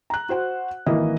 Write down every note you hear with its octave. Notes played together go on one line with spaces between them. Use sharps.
A#5 F#6
F#4 C5 F#5
G#1 E3 A#3 E4 D#5